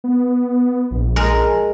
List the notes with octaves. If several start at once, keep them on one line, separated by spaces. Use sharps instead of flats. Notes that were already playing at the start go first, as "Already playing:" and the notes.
B3
A#1
G#3 A#4